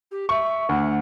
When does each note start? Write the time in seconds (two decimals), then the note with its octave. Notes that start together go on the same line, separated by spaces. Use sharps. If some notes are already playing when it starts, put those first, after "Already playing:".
0.11 G4
0.29 E5 C#6
0.69 D2 F#5